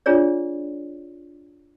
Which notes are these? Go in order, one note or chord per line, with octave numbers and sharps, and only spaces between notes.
D4 F4 G#4 C#5 D5